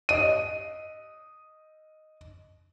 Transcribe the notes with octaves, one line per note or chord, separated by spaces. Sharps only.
D#5 D#7